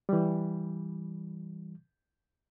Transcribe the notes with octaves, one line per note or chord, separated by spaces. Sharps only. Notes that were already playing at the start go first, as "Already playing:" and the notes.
E3 G3